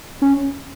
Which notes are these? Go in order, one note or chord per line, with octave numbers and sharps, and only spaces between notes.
C#4